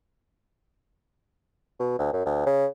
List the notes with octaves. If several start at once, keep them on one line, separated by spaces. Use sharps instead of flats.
B2
D2
F#2
D2
C#3